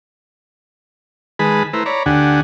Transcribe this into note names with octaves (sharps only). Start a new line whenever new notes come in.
D#3 G#3 G#4 B4 A5 B5
A3 E4 B4 C5 A#5
C#5 D5 A#5 B5
D2 D3 D4 G4 F#5 G#5